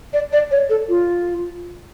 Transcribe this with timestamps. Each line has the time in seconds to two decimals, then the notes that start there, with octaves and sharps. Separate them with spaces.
0.13 D5
0.33 D5
0.51 C#5
0.70 A4
0.89 F4